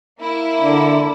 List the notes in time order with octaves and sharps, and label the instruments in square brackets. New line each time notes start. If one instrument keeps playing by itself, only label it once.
[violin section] A#3 E4
[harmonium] D3